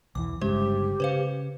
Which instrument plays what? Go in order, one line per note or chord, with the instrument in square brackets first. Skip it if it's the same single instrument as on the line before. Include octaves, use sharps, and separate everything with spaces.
[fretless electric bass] B1 E2 E3 [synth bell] D6
[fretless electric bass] G1 G2 C#3 [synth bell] G#3 C5 [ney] G4
[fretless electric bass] C#3 [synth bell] B4 C5 F5